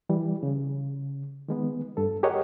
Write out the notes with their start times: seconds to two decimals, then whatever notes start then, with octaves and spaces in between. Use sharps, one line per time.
0.09 E3 G3
0.43 C#3
1.48 D#3 G#3 B3
1.97 G2 A4
2.23 G4 G#4 A#4 C#5 D#5 F#5